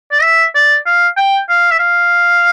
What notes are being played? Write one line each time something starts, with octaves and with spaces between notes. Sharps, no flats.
D5
E5
D5
F5
G5
F5
E5
F5